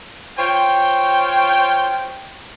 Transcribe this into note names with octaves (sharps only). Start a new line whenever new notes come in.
F4 C5 C#5 G5